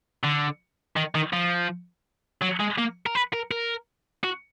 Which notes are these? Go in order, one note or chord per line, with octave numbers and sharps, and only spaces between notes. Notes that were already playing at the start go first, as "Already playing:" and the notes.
D3
D#3
D#3
F3
F#3
G#3
A#3
A#4
B4
A#4
A#4
F#4